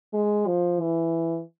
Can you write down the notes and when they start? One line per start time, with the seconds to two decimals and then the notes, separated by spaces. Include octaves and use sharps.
0.13 G#3
0.47 F3
0.80 E3